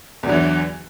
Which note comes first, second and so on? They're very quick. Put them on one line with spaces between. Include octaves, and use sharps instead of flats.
E2 F#3 D3 E3